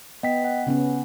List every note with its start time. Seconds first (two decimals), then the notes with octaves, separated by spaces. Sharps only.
0.23 B3 D#5 G5 B6
0.44 F#5
0.67 C#3 B3 C#4